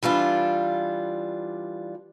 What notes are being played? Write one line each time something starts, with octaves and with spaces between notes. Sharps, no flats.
E3 G3 D4 F4